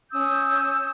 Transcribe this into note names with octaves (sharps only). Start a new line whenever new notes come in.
C#4 D#6 E6 G6